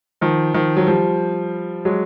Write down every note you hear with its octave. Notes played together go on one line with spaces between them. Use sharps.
D#3 F3
D#3 F3
F#3
F3 G3
F#3 G#3